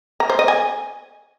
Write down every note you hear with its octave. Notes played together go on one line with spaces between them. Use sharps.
A#5
C5
D#5
G#5